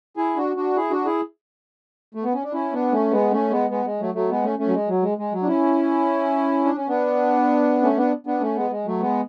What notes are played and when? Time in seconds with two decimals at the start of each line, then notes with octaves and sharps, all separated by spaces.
0.17 E4 G#4
0.37 D4 F#4
0.56 D4 F#4
0.76 E4 G#4
0.91 D4 F#4
1.05 E4 G#4
2.15 A3
2.24 B3
2.33 C#4
2.43 D4
2.53 C#4 E4
2.72 B3 D4
2.92 A3 C#4
3.11 G#3 B3
3.31 A3 C#4
3.51 G#3 B3
3.70 G#3 B3
3.85 G#3
4.00 F#3 A3
4.14 F#3 A3
4.29 G#3 B3
4.44 A3 C#4
4.59 A3 C#4
4.67 F#3
4.73 G#3
4.88 F#3
5.03 G#3
5.18 G#3
5.32 F#3
5.43 D4
5.47 C#4 E4
6.65 D4
6.76 C#4
6.88 B3 D4
7.82 A3 C#4
7.97 B3 D4
8.27 B3 D4
8.41 A3 C#4
8.56 G#3 B3
8.70 G#3
8.86 F#3 A3
9.00 G#3 B3